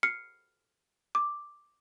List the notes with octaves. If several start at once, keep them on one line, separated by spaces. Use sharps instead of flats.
F6 C7 C#7
D6